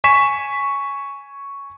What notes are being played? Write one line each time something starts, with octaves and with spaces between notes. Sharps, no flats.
G#5 C#6 B6 E7